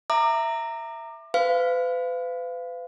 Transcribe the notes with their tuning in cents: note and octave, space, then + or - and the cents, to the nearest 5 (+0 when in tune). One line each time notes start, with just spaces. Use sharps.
E5 +0 A#5 -15 D6 +30
B4 +40 F5 -15